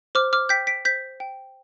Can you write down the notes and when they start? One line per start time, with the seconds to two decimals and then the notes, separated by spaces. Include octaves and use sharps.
0.15 C5 D6 F6
0.33 D6 F6
0.49 G5 G6 B6
0.67 B6 D7
0.85 C5 G6 B6
1.20 G5